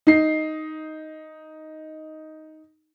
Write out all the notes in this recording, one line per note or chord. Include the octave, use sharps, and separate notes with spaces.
D#4 C7